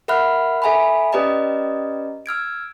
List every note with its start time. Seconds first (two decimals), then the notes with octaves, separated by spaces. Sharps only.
0.08 A#4 E5 F#5 B5 F6 F#6
0.62 A4 E5 G#5 A#5 B5
1.12 C#4 G4 B4 D5 D#5 A#5
2.26 E6 F6 G#6 D7